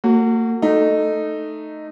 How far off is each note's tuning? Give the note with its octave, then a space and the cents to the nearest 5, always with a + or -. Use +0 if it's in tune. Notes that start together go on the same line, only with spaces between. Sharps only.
A#3 -40 F#4 +0
A3 +0 D#4 -10